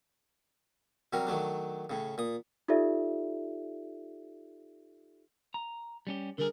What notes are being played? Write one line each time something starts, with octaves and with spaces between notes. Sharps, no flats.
C3 F#3 G3 A#4
D#3 F#3 A3 D4
A2 C#3
A#2 D#6
D#4 F4 G4 A4 D5 E5
A#5
G3 C#4 G4
D3 G3 G#4 A#4